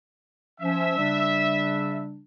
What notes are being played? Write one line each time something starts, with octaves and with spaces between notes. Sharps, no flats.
F3 C#4 E5
C#3 G3 D4